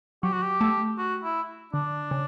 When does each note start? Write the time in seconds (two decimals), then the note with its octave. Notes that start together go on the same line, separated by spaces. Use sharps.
0.23 F#3 G4
0.33 F#4
0.43 G4
0.61 A3
0.98 F#4
1.24 E4
1.73 D3 D4
2.11 C#3